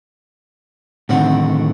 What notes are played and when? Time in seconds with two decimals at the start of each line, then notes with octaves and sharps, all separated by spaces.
1.09 A2 D3 D#3 A3 C4 F#4